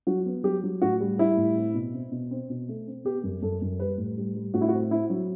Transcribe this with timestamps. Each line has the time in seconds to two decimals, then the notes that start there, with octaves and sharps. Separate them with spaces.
0.07 F#3 F#4
0.26 B3
0.44 F#3 G4
0.64 F#3
0.82 A2 F#4
1.01 G3
1.18 G3 E4
1.37 A2
1.57 C4
1.74 B2
1.94 C4
2.11 B2
2.31 C4
2.50 B2
2.68 A3
2.87 C4
3.05 B3 G4
3.24 F#2
3.42 F#2 A4
3.62 F#2
3.79 G3 B4
3.98 A2
4.18 G3
4.35 G3
4.54 A2 F#4
4.61 E4
4.68 F#4
4.73 C4
4.91 C4 E4
5.10 F#3